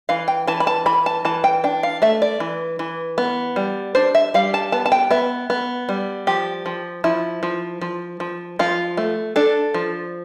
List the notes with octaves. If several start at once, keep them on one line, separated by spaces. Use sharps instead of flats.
E3 F5
G5
E3 A5
B5
A5
E3 B5
A5
E3 A5
G5
D4 G5
F5
A3 E5
D5
E3
E3
B3
G3
D4 C5
E5
G3 F5
A5
B3 A5
A5
G5
B3 E5
B3
G3
F3 G4
F3
F3 E4
F3
F3
F3
F3 F4
A3
D4 A4
F3